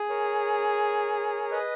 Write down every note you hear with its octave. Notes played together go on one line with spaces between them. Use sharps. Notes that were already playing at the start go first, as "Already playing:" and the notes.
Already playing: G#4
A#4 C#5
B4 D#5